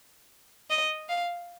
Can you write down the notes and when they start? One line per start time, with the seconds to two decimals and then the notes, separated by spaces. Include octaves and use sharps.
0.70 D#5
1.09 F5